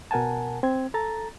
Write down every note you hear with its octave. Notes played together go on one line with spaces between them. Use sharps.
B2 A#4 F#5 G#5 A5
C4 G#6
A4 A#5 A6